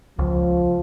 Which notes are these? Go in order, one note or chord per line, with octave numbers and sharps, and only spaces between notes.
C#2 F3